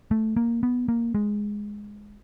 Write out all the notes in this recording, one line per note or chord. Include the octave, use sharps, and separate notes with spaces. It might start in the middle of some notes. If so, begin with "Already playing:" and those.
A3
A#3
B3
A#3
G#3